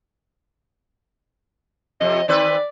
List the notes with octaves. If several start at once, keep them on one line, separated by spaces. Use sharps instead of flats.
F2 C3 D#5
D#3 C4 B4 D5